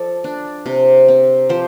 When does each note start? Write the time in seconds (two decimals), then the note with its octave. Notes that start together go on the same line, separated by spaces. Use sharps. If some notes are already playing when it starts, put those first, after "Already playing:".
Already playing: F3 A4 D5
0.24 D4
0.66 C3
1.08 C4
1.49 F3 G4 C5